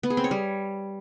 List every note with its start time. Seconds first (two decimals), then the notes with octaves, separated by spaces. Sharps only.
0.03 B3
0.10 G#4
0.17 C4
0.24 C#5
0.31 G3